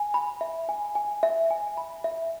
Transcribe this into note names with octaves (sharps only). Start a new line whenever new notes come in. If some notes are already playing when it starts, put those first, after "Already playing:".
Already playing: G#5
B5
E5
G#5
G#5
E5
G#5
B5
E5